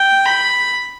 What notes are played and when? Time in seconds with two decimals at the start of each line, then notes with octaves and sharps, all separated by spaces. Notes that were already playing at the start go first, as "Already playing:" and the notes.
Already playing: G5
0.26 B5